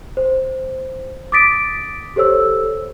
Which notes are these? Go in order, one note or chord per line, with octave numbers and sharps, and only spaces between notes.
C5
D6 D#6 A6 B6 D7
G4 A4 C5 C#5 E6